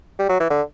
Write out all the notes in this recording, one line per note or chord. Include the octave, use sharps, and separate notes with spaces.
G3
F#3
E3
D3